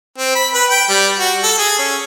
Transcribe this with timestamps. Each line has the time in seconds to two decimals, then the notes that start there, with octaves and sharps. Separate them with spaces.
0.18 C4
0.35 B5
0.53 B4
0.70 G5
0.89 G3
1.19 F#4
1.43 A4
1.58 G#4
1.79 C#4